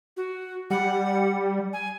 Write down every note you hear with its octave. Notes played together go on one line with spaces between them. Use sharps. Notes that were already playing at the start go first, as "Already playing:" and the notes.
F#4
G3 F#5
G#5